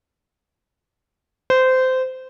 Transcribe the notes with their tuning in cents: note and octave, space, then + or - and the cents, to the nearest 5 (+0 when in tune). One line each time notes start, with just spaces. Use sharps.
C5 -20